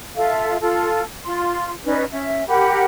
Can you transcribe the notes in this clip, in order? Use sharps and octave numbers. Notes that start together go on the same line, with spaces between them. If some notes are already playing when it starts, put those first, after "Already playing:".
F4 A4 E5 F5
F4 A4
F4 C6
C#4 D#4 B4 D5
C#4 E5
G4 A#4 F#5 B5